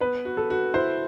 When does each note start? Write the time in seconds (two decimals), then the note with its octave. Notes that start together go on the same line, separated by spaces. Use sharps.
0.01 B3 B4
0.25 F#4
0.37 A4
0.50 F#4
0.74 E4 C5